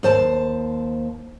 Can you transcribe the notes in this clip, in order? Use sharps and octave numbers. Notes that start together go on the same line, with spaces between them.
D#2 C5 A5